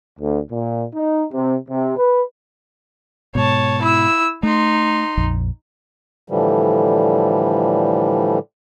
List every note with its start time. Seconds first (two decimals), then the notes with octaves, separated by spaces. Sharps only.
0.19 D2
0.51 A#2
0.94 D#4
1.33 C3
1.68 C3
1.97 B4
3.35 G#2 B2 C#5 A5
3.82 E4 E6
4.43 A3 D#4 C6
5.17 A#1 F2
6.29 A2 D3 E3 F3 G3